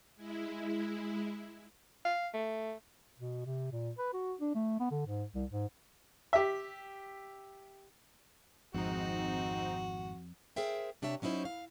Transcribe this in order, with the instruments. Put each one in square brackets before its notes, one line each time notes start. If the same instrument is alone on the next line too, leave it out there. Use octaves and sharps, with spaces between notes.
[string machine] G#3 E4
[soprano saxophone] F5
A3
[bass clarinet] B2
C3
A#2
B4
F#4
D4
A3
B3
D3
G#2
C2
G#2
[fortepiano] G4 E5
[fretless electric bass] G#1 G#2 [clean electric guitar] F2 [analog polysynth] C4 D#4 [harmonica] F#4
[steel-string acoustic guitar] G#4 A#4 C5 E5 G5
C3 D4 G4 C#5 E5
F#3 C#4 D#4 E4 C5
F5